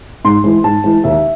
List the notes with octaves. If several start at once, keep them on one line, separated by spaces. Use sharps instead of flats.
G#2 C6
E3 G#3
G#2 A5
E3 G#3
D#2 E5